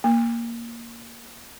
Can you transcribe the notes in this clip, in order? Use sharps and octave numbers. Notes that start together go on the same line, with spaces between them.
A#3